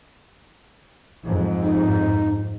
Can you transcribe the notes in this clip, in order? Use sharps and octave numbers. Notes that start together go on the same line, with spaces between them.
F2 G#2
D#4